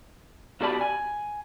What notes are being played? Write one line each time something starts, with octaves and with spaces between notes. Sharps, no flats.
B2 F#4 G4 D5 A5 B5
G#5